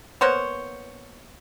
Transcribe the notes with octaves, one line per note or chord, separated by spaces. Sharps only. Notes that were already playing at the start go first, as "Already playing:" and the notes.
A#3 B3 C5 C#5